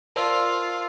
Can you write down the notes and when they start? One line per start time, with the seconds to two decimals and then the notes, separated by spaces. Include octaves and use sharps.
0.16 F4 A#4 C5 D5 A5 E6